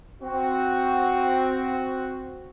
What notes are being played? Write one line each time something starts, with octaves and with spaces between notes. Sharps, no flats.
C4 F#4